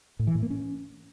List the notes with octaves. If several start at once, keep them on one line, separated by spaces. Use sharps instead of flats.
A2
E3
A2
A#3
C#4